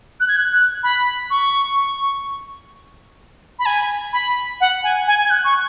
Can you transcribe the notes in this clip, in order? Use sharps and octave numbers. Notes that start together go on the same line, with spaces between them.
F#6
G#6
F#6
F#6
B5
C#6
B5
G#5
B5
F#5
G#5
G#5
G#6
F#6
C#6